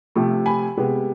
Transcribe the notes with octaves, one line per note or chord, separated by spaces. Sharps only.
C3 F3 A3
G#5 B5
C3 G#3 B3